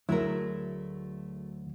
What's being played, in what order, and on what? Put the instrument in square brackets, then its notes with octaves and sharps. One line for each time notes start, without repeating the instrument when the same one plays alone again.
[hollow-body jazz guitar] D2 E4 [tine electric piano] F#3 [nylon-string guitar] A3 G#4 A#4